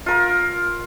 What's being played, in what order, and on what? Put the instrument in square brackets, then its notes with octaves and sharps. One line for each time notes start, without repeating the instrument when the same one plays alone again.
[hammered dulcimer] F4 A#4